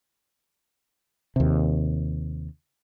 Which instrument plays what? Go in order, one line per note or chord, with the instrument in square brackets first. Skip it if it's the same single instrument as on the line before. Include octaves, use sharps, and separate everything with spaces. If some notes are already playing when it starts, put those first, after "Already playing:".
[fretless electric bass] D#2 C3